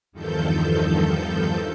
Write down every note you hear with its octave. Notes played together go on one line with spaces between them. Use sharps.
E2 G2 D#3 F3 A4 G6